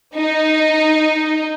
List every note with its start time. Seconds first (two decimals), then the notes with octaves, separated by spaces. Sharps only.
0.15 D#4